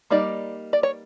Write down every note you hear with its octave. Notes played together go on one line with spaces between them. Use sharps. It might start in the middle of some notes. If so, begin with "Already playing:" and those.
G3 A#3 D#4 D5
D5
C#5